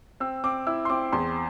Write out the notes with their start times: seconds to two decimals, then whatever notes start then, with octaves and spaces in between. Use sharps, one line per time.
0.20 C4 E6
0.44 C4 D6
0.67 E4 E6
0.85 C6
0.90 C4 D6
1.13 E2 C6